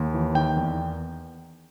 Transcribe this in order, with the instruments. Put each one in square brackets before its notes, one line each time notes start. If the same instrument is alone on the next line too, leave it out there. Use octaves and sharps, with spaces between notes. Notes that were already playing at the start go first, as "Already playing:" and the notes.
Already playing: [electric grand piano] D#2
E3
D#3 G5
E2